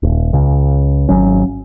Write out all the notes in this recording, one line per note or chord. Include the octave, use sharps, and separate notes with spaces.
D#1
C#2 C#3
G#1 F#3 C#4